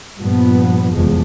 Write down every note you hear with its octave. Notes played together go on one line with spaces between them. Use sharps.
G2 A#2 F3 B3
F1 B1 E2 F3 G#3